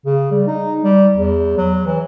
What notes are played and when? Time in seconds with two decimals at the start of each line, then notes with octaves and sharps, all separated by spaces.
0.06 C#3
0.31 G3
0.47 D#4
0.84 G3
1.16 E2
1.57 F#3
1.86 E3